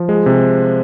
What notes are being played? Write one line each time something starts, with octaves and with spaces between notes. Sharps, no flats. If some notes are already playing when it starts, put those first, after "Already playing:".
Already playing: F3
G#3
C3